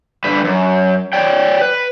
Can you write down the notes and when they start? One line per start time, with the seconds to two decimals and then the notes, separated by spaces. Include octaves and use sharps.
0.24 G2 D3 B4
0.45 F#2
1.13 C#5 D5 G5
1.61 B4